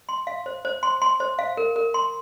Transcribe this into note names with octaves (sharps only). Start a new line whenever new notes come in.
C6
F5
C5
C5
C6
C6
C5
F5
A#4
A#4
C6